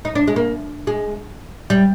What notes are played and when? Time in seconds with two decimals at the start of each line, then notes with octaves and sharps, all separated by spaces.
0.05 D#4
0.15 D4
0.28 G#3
0.36 A#3
0.87 G#3
1.70 G3